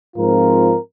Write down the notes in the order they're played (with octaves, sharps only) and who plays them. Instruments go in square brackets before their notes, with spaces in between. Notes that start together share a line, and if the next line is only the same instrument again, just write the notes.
[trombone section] G#2 F3 C4 F4 A#4